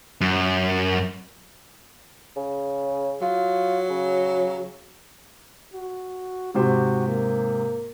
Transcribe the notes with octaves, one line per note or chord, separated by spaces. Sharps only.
F#2
C#3
F#3 F4
C#3
F#4
G#2 C3 F#4 C5
A#3